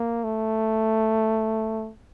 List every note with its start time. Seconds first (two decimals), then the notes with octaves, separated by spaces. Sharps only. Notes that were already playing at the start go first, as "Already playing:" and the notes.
Already playing: A#3
0.24 A3